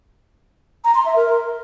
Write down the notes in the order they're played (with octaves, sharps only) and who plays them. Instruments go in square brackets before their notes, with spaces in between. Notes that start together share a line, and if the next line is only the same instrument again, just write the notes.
[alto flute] A#5
C6
E5
A#4